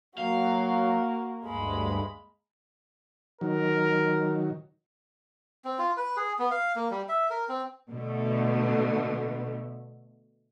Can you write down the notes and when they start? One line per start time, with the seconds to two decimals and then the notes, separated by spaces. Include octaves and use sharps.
0.18 F#3 A#3 F#4 F5
1.46 D2 G2 G#3 B5
3.41 D#3 F#3 A#4
5.65 C4
5.79 F4
5.97 B4
6.17 G#4
6.39 B3
6.51 F5
6.76 A#3
6.91 G3
7.09 E5
7.30 A#4
7.49 C4
7.89 B2 D3 A3